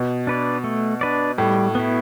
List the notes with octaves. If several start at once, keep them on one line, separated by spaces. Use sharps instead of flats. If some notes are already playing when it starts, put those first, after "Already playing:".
Already playing: B2
D4 B4 D5
A3
D4 B4 D5
A2 G3
B3 E4